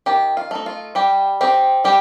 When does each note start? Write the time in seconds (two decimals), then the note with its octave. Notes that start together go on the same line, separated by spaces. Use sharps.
0.06 D#3 G4
0.37 F4
0.51 A3 D#4
0.66 F4
0.95 G3 G4
1.41 C4 D#4 G4
1.84 G3 G4